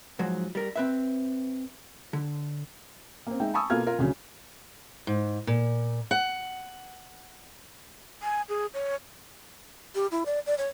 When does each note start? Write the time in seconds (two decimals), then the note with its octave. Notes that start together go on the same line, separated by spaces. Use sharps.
0.19 G#2 F3 F#3
0.55 G3 A#4
0.76 C4 B4 E5
2.13 D3
3.27 A#3 C4
3.40 G#3 D#4 E5 G5
3.54 G#5 A5 B5 C#6 D#6 E6
3.70 B2 A#3 F4 A4 F6 G#6
3.86 F4 A#4
3.98 D2 C#3 F#3
5.07 G#2
5.47 A#2
6.11 F#5
8.23 G#5
8.49 G#4
8.74 C#5
9.95 G4
10.12 E4
10.26 D5
10.46 D5
10.58 C#5